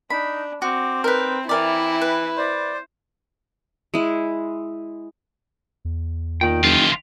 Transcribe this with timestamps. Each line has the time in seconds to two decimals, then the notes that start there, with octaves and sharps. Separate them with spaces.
0.10 D4 D#4 B5
0.62 C4 F#4 D6
1.04 D#4 A#4 B4
1.49 E3 E4 A#4 D5 G5
2.02 B4
2.37 C5 D5
3.94 G#3 E4
5.85 E2
6.41 A#2 D#3 G5
6.64 F#1 E3 F4